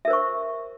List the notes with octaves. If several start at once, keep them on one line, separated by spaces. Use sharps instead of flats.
A#4 C5 E5 C#6